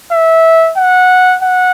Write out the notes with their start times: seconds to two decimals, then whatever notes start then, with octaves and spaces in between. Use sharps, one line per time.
0.12 E5
0.77 F#5
1.43 F#5